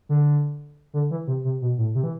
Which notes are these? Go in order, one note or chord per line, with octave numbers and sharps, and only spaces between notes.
D3
D3
E3
C3
C3
B2
A2
C3
E3